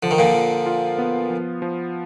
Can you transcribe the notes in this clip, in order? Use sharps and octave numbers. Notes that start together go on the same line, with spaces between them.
D3 F3
D#3
A#2 D3
F3
F4
B3
F3
F3